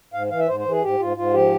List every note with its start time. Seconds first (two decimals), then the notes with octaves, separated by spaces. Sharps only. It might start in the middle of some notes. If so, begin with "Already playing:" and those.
0.13 G#2 F5
0.31 E3 F5
0.39 E5
0.48 G#2 C5
0.60 C5
0.65 E3
0.71 G#4
0.83 G#2 G4
1.00 G#2 F4
1.17 G#2 F4
1.34 F3 G4